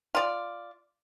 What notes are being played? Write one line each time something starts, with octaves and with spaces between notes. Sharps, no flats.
F4 D5